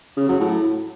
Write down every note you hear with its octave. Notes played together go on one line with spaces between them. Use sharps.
C#3
F#3
A2